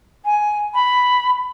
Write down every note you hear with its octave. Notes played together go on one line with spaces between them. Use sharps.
G#5
B5